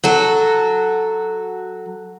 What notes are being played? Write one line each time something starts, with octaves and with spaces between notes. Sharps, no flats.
F#3 F#4 A4